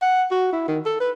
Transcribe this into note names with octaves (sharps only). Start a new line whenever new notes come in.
F#5
F#4
E4
D#3
A4
B4